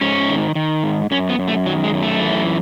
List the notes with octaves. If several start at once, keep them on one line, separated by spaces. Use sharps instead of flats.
G#2 C#4
D#3
D#3
G#2
F#2 C#4
B3
F#2
A3
D#3 F#3
G#3
F#2
A3
E3